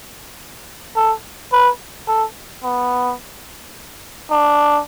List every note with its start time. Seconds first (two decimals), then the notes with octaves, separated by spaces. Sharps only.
0.96 A4
1.52 B4
2.08 A4
2.63 B3
4.31 D4